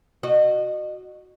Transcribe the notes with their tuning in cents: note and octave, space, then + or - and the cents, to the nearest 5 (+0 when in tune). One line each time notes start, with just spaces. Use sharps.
F#4 +0 D#5 -35